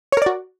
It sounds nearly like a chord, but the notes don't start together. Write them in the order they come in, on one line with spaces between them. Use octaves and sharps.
C#5 A#4 D5 F#4